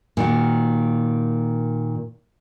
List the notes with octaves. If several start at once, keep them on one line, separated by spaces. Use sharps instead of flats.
A#2 D#3 F#4